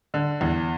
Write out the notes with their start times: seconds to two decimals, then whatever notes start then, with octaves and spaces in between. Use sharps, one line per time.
0.14 D3
0.41 E2